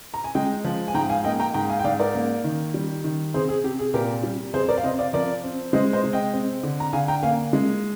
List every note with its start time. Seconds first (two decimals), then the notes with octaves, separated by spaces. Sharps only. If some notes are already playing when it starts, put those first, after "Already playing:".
0.14 A#5
0.24 G#5
0.35 G#3 D#5 G5
0.64 F3
0.88 G#5
0.94 G#2 G5 A#5
1.09 F5 G#5
1.24 A#3 D#5 G5
1.39 G5 A#5
1.54 G#2 G5 A#5
1.69 F5 G#5
1.79 G5
1.84 G#2 D5 F5
1.99 A#4 D5
2.15 A#3
2.44 D#3
2.74 G3
3.04 D#3
3.34 C3 G#4 C5
3.49 G#4
3.64 C3 G4
3.79 G#4
3.94 A#2 G4 A#4
4.23 G3
4.53 F2 G#4 C5
4.68 A#4 D5
4.78 F5
4.83 C3 C5 D#5
4.99 D5 F5
5.13 F3 A#4 D5
5.44 C4
5.73 G#3 C5 D#5
5.93 C5 D#5
6.03 C3
6.13 D#5 G5
6.33 C4
6.63 D3
6.80 A#5
6.93 D3 F5 G#5
7.08 G5 A#5
7.23 A#3 F5 G#5
7.53 G#3